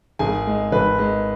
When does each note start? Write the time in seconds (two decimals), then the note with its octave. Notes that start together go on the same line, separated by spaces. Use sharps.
0.19 G#1 G#4 G#5
0.47 G#3
0.72 G#1 B4
0.99 G#3